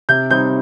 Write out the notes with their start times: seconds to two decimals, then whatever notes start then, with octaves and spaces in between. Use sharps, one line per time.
0.09 C3 G6
0.30 G3 C4 D#4 G6